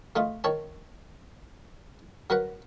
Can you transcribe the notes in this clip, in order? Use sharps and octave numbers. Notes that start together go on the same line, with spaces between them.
A3 D#4 F4
D#3 C#5 A5
F#3 A#4 B4 F#5